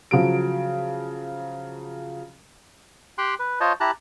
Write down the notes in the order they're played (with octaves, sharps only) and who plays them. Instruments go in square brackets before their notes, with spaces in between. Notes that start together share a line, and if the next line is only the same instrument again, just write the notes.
[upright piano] C#3 F3 F#3 D7
[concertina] G4 G5 C6 F#6
B4
F4 C5 C#5 D#5 A5
E4 G4 A5 A#5 F#6